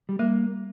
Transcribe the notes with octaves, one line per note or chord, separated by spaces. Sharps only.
G3
G3 A#3